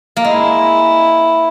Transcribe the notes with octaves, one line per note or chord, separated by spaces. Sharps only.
A#3
G#3 E4